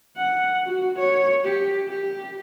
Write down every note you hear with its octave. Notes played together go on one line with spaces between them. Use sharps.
F#5
F#4
C#5
G4
G4